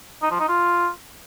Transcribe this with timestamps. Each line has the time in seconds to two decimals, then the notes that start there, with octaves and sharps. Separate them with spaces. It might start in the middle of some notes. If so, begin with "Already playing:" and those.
0.22 D#4
0.31 F3
0.40 D#4
0.48 F4